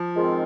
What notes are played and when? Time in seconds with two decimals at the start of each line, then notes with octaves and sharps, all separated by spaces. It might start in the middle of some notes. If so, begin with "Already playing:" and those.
Already playing: F3
0.15 G#2 D#3 G#3 C4 F4